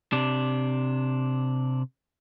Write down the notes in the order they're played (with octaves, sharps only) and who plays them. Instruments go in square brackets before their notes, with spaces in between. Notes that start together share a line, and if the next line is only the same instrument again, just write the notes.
[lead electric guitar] C3 D4